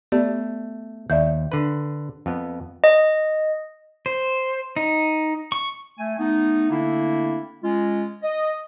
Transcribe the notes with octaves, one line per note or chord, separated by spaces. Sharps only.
A3 B3 G4 D5
D#2 D5 E5 G6
D3 B4
F2 B3
D#5
C5
D#4
C#6
A3 G#5
A3 B3 D#4
D3 A3 A#3 C4 D4 E4
G#3 C#4 F4
D#5